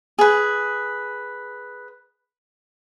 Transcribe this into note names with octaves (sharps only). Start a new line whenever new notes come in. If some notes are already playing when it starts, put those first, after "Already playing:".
G#4 B4